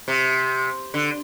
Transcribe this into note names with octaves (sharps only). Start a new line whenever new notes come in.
C3
D3